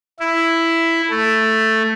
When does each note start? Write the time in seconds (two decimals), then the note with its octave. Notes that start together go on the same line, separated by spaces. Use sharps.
0.19 E4
1.10 A3